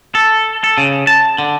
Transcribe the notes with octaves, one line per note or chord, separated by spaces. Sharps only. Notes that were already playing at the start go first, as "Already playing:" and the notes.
A4
A4
C#3
A5
D3